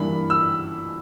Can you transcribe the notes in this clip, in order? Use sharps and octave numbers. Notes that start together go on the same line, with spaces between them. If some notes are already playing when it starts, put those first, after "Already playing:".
Already playing: G2 E3 G3 A#3 D4 B5
E6